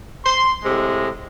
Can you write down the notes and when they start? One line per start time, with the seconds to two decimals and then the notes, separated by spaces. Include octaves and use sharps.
0.24 C6
0.64 A2 C3 G#3